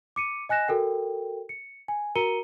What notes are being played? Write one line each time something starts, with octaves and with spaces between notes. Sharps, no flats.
D6 C#7 D#7
D#5 G#5 F#6 A#6 E7
F#4 A4 A#4 G5
C#7
G#5
F#4 A#4 A#5 C#7 D#7 G7